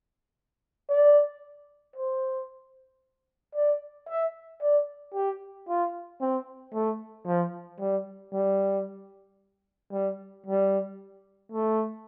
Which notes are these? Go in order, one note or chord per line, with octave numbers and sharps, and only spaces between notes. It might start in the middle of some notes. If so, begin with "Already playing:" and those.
D5
C5
D5
E5
D5
G4
F4
C4
A3
F3
G3
G3
G3
G3
A3